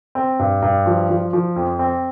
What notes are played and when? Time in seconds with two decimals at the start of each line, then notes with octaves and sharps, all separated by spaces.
0.15 C4
0.39 G2
0.62 G2
0.86 F3
1.10 F3
1.33 F3
1.56 F2
1.79 C4